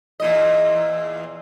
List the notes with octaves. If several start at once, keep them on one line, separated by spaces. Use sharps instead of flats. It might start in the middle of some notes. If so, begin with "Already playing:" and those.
E2 A#2 D#5